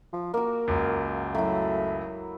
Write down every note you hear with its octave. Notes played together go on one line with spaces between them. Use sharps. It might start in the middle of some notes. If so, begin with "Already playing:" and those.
F3
A#3 F#4 A#4
C#2 F#2
F#3 A3 E4